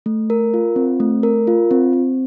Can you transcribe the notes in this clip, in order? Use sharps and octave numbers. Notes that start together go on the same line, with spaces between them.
A3
A#4
F4
C4
A3
A#4
F4
C4
C4